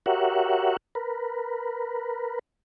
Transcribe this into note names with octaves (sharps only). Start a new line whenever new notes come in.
F#4 G4 A#4 C#5 E5 F#5
A#4 B4